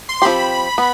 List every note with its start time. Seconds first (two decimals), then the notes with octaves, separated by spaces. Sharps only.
0.09 C6
0.22 F3 C4 G4 B5
0.78 B3